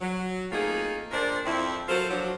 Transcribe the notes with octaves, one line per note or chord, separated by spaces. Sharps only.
F#3
A3 A#3 C4 D#4 F4 G#4
A#2 D4 A#4 C5 D5
F2 F3 C4 E4
F#3 F4 A4 A#4 C5
F3 F#3 D4